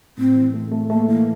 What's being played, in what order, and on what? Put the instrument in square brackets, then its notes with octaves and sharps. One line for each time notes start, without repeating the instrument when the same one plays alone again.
[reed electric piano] A2 [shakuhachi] C4
[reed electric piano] E3
A3
A3
[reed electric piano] A3 [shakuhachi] A#3
[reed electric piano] E3 [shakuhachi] A#3